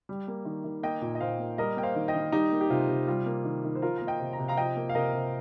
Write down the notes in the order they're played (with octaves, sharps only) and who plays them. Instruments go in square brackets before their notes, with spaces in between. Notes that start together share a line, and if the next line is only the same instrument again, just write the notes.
[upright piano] G3
A#3
D#3
D#3
A#3 D#5 G5
A#2
D#5
A#2 C5 F5
A#3
G3 A#4 D#5
A#3 G5
C5 F5
D#3
D#5 G5
D#3
G3 D#4 G4
A#3
G4
C3 F4
C3
G3 F4
A#3
D#3
D#3
C5
F3 F4 A#4
A#3 A#5
D#5 G5
C3
A#5
C3
F5 A#5
F3 D#5 G5
A#3
F5
C3 A#4 D#5
C3